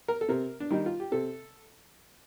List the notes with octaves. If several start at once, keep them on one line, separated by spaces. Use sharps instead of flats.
A#4
A4
C3 A#4
D4
D#3 G3 D#4
F4
G4
C3 A4